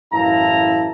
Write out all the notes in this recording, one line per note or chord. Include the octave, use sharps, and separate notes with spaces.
A1 F#2 E4 F5 A5 A#5